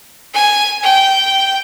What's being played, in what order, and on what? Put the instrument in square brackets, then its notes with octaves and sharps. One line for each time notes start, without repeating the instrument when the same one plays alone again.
[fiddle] G#5
G5